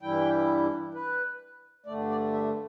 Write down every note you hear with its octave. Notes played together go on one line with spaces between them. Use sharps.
G2 E3 G3 E4 G5
B4
G2 D3 A3 D5
D5
E5